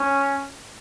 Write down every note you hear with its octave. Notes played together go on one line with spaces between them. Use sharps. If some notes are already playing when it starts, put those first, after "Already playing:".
Already playing: C#4